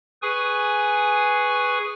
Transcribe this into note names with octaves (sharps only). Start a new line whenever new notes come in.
G#4 B4 G#5 C#6 D#6